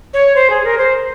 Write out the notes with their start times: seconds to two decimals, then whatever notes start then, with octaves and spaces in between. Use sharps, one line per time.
0.13 C#5
0.35 C5
0.50 G#4
0.64 A#4
0.78 C5